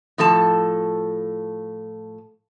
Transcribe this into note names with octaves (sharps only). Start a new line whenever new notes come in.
A2 F3 A4 A5